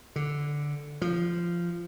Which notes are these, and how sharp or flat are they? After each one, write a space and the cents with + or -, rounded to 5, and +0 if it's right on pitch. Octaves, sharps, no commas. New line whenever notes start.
D3 -5
F3 -15